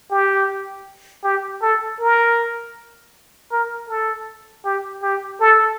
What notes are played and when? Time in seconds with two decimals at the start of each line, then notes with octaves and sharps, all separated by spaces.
0.11 G4
1.24 G4
1.62 A4
2.00 A#4
3.52 A#4
3.89 A4
4.65 G4
5.03 G4
5.40 A4